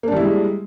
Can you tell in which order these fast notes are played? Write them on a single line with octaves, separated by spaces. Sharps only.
A#3 D4 G3 E4 G#3